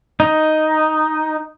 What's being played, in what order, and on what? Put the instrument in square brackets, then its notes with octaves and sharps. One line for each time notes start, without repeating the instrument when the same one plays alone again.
[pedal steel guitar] D#4